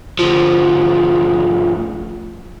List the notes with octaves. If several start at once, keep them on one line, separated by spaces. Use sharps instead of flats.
D2 F3